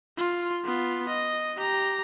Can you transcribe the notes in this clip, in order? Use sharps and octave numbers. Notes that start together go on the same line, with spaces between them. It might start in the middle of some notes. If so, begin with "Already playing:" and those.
F4
B3 F4
D#5
G4 A#5